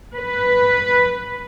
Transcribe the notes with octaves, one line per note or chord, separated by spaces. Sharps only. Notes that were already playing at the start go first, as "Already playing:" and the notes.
B4